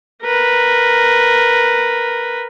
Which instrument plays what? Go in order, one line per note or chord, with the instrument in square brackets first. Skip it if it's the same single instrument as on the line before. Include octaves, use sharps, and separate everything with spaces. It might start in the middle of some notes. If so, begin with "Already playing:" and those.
[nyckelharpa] A#4 B4